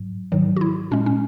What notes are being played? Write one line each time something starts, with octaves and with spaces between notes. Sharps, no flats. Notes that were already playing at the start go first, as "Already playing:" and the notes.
Already playing: G#2 F#3
G#2 D#3 F#3
F#4
E4
A#2 G#3 C#4
C#4